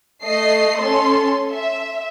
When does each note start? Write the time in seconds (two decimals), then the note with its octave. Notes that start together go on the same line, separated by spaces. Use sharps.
0.23 A3 D#5 C7
0.80 C#4 A4 C6
1.51 E5